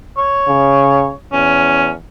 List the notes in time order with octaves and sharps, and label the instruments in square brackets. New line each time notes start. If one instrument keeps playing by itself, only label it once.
[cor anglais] C#5
[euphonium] C#3
[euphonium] E2 [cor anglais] C#4